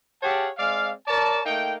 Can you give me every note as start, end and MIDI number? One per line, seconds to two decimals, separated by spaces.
0.22 0.49 67
0.22 0.49 68
0.22 0.49 73
0.22 0.49 77
0.22 0.49 78
0.22 0.49 81
0.57 0.91 56
0.57 0.91 60
0.57 0.91 74
0.57 0.91 77
1.07 1.39 70
1.07 1.39 73
1.07 1.39 74
1.07 1.39 81
1.44 1.75 57
1.44 1.75 58
1.44 1.75 63
1.44 1.75 79